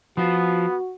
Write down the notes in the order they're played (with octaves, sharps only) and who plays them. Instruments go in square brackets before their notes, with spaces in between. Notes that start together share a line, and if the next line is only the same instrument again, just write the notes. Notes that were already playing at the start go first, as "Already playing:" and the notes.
[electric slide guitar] F3 F4 [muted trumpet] B3 [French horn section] F#4